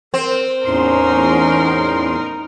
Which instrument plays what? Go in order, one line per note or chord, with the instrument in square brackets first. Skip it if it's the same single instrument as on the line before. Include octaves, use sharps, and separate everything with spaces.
[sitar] C4 [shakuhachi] A#4
[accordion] E2 A2 C6 [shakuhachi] C#4 [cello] D#4 A#4